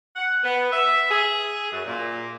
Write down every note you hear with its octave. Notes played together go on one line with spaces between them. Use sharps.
F#5
B3
E5
G#4
F#2
A#2